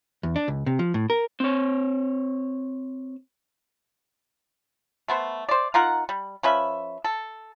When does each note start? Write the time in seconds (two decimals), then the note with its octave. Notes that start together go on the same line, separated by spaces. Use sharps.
0.23 E2
0.36 D4
0.48 C#2
0.66 C3
0.79 F3
0.94 A2
1.10 A#4
1.40 C4 C#5
5.08 A3 B3 C5
5.49 C5 D5
5.74 D#4 F4 A#4 F#5
6.09 G3
6.43 F3 C#4 B4 E5
7.04 A4